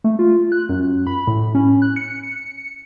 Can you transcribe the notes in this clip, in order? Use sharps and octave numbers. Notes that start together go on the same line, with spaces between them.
A3
F4
F#6
F#2
B5
A2
C#4
F#6
C#7
C#7